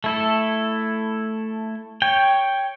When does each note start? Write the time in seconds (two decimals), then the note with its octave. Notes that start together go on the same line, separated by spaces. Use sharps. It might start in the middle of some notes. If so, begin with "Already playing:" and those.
0.04 A3 E4 A4
2.02 C#5 G5